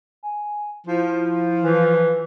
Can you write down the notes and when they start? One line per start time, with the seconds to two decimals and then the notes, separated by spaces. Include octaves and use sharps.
0.23 G#5
0.87 F3 E4
1.62 E3